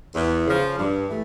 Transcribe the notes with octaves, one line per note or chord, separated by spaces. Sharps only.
E2
C#3 F3
G2
E3 A3